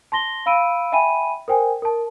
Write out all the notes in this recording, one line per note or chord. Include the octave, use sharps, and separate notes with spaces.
A5 C6 A#6 G7
F5 B5 E6 D7 D#7
E5 G5 G#5 B5 D#7
A#4 C5 G5 G#5
A#4 A5